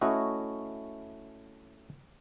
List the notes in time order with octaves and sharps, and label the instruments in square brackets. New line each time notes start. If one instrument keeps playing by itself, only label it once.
[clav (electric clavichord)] A3 C#4 E4 F#4 D#5